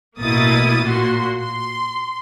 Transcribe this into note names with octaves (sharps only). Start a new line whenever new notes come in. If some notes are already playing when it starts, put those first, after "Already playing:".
A1 B2 A#3 E4 D#6 A6
A#2 F#4 C6
C6